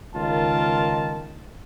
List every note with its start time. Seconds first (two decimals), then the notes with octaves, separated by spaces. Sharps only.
0.15 C#2 D#3 F4 A#4 A5